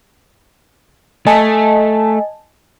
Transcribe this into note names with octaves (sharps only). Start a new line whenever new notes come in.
A3 D#5 G#5 A5